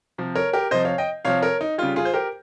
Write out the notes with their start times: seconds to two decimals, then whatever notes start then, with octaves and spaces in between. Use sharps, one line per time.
0.18 C3 F3
0.36 A#4 C#5
0.53 G4 A#4
0.71 C3 F3 C5 D#5
0.85 C#5 F5
0.98 D#5 G5
1.25 C3 F3 C#5 F5
1.43 A#4 C#5
1.61 D#4
1.78 C#3 G3 F4
1.96 F4 G#4
2.05 C5
2.14 G4 A#4